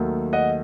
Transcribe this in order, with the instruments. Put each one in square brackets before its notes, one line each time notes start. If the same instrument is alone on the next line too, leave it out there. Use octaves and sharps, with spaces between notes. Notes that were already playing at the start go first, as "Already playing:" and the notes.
Already playing: [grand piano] D#2 D#3 F#3 A3
D#5 F#5